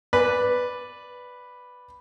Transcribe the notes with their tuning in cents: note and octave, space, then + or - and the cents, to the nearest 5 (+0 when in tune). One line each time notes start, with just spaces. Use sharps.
B4 +0 D5 +0 G#5 +0